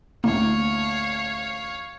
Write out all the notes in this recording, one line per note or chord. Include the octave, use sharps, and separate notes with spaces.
A1 D2 A2 A#3 C#5 F5